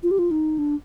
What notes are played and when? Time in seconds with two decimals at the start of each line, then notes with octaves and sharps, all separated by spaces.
0.03 F4
0.11 G4
0.19 F4
0.31 D#4
0.58 D4